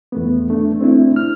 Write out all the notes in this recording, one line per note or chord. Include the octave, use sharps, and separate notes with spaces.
E2 A3 B3
A3 D4
A3 C4 D4 E4
F6